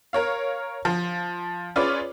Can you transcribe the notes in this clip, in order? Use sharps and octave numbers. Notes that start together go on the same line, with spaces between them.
A#4 C#5 F5
F3
C#4 F4 G#4 B4 C#5 D5